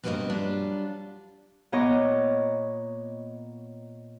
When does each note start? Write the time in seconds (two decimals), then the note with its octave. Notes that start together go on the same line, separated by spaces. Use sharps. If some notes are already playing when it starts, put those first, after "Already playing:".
0.04 G2 B2 F3 A#3 C4 D#5
0.29 F#3 G3 D4 F4
1.72 A#2 B3 C#5 D#5 C#6 D6